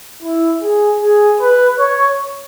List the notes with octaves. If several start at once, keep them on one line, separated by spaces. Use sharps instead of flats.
E4
G#4
G#4
B4
C#5